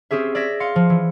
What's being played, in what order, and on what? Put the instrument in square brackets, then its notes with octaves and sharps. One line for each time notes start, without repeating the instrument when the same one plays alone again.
[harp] C4 C#4 G4 G#4 E5
D5 E5 G#6 A#6 B6
F5 C6 C#7
F3
E3